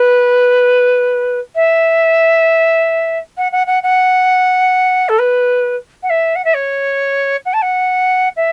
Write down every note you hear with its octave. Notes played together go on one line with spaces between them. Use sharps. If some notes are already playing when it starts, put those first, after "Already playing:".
Already playing: B4
E5
F#5
F#5
F#5
F#5
A4
B4
F#5
E5
F#5
E5
C#5
F#5
A5
F#5
E5